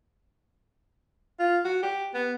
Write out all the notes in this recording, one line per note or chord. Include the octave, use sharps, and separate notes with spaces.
F4
F#4
G4
B3